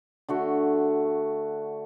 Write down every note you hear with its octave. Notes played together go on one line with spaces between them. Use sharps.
D3 A3 F#4